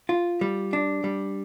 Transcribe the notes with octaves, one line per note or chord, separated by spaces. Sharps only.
F4
G3
D4
G3